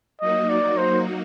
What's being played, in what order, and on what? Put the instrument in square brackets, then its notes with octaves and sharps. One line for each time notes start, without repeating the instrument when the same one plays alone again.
[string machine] F#3 A#3 D#4 F#4 [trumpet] D#5
[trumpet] D5
C5